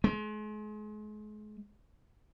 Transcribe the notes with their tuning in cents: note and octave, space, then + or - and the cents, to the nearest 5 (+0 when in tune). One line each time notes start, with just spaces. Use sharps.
G#3 +35